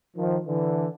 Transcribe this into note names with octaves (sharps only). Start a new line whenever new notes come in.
D#3 F3
D3 E3